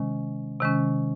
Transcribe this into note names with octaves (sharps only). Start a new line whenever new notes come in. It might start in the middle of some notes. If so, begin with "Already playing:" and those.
Already playing: C3 D#3 G#3 C#4
C3 D#3 G#3 C#4